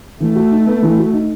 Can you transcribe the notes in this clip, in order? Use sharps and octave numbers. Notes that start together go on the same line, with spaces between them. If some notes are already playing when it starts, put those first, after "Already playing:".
E3 A3
F#4
D#4
B3
E3
F#4
D#4